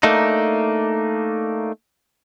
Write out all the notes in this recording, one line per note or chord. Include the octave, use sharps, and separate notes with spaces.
A3 A#3 D4 D#4